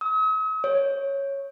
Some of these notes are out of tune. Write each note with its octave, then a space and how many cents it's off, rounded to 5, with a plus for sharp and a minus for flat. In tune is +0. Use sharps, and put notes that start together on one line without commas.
D#6 +45
C#5 -5